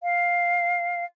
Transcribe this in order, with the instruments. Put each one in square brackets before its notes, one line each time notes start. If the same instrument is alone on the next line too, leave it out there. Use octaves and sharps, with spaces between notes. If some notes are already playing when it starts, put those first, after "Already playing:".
[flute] F5